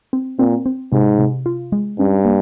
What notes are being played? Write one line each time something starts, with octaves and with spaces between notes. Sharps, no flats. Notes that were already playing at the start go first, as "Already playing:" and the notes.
C4
A#2 C4
C4
G#2 C3
C3
F4
G#3
G2 C#4
A#3